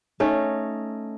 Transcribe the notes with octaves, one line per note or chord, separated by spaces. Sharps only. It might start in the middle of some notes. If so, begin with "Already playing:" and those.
A3 C#4 D#4